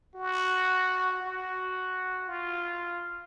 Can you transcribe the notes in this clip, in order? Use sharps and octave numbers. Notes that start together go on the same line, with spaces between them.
F#4
F#4
F4